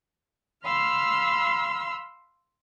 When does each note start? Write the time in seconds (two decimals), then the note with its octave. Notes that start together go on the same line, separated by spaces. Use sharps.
0.65 F5 B5 C6 E6 F6